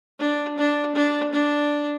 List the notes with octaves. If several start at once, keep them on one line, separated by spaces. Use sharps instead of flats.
D4
D4
D4
D4